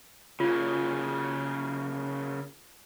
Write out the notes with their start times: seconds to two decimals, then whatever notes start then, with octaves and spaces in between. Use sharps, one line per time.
0.40 C#3 A#3 F4